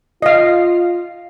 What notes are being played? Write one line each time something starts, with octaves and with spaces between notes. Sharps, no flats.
F4 D#5 F5